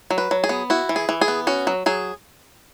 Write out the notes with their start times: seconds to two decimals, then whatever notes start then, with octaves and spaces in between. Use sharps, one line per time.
0.11 F#3
0.18 B4
0.31 F#3
0.44 G#4
0.49 B3
0.70 E4 F#4
0.89 E3
0.96 G#4
1.09 E3
1.21 G#4
1.28 B3
1.47 C#4 F#4
1.67 F#3
1.86 F#3 G#4